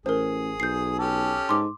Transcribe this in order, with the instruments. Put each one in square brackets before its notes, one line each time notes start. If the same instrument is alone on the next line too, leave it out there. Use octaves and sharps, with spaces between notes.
[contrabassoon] A1 [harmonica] G#4 [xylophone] A#4 C5
[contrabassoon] B1 [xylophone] G6 C7
[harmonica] C#4 G4 A4
[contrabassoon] G#2 [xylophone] C6 D6